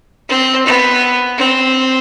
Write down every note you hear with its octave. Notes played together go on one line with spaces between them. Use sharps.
C4
B3
C4